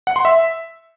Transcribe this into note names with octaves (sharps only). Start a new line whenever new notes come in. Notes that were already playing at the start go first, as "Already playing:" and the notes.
F#5
C6
E5